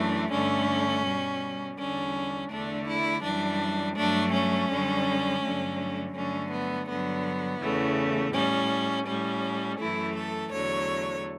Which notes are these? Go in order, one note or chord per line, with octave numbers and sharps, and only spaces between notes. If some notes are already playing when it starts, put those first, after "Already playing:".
Already playing: F#2 E3 A3 D4
G2 D3 A3 C#4
B2 G3
E2 D3 G3 C#4
E2 D3 A3 D4
E4
F#2 E3 G3 D4
G2 F#3 A3 D4
C#4
F#2 D3 G3
G2 D3 F#3 A3
G2 D3 F#3 A3 C#4
B3
G2 D3 F#3 B3
E2 C#3 E3 A3
A2 G3 C#4
A2 G3 C#4
F#2 E3 A3 E4
A4
E2 D3 F#3 A3 C#5